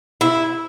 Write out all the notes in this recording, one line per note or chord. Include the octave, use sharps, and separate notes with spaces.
E4